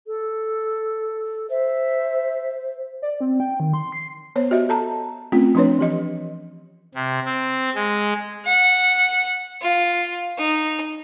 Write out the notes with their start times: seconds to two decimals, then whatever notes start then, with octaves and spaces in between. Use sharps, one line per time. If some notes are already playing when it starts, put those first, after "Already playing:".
0.07 A4
1.50 C5 E5
3.02 D5
3.21 C4
3.40 G5
3.60 D#3
3.74 C6
3.92 C7
4.36 B3 C5 C#5
4.51 F#4 G4 D#5 E5
4.69 A4 A5 A#5
5.32 A3 C4 C#4 F4
5.55 F3 C4 D4 B4 C#5
5.79 E3 G4 D#5
6.94 C3
7.25 C4
7.75 G#3
8.45 F#5
9.61 F4
10.38 D#4